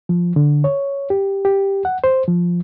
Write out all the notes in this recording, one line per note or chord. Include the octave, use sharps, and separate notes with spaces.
F3
D3
C#5
G4
G4
F#5
C5
F3